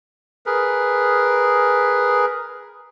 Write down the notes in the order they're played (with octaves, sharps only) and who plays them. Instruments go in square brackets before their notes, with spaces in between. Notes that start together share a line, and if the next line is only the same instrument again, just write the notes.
[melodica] G#4 A#4 B4